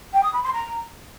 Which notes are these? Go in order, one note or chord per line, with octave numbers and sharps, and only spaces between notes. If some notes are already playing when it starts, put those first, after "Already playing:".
G5
D#6
B5
C6
A#5